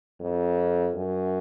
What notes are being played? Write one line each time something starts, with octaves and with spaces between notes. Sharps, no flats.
F2
F#2